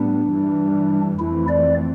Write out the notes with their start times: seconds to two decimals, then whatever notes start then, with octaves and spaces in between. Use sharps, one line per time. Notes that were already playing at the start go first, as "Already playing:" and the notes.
Already playing: A2 G3 B3 D4
0.32 G2 E3 G3
1.19 F2 E3 A3 C4 E4
1.48 D5